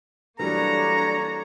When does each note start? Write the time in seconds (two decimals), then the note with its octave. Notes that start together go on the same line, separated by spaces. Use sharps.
0.39 E3 F#3 G3 A#3 D4 A4 C#5 A#5